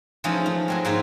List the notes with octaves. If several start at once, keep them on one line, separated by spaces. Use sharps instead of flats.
E3 F3 G#3 A3 C#4 D#4
A3
F#3 G#3 C4
G#2 A#3 D#4 G#4 E5